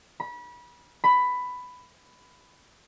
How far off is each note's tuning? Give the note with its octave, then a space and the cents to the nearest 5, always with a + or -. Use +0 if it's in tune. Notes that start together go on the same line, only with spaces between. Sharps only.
B5 -30
B5 +10